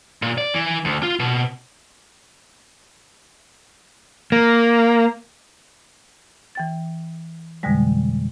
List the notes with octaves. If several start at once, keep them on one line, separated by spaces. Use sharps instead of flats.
A#2
D5
E3
D2
F4
B2
A#3
E3 G5 A6
F2 B2 D3 E3 G3 G#3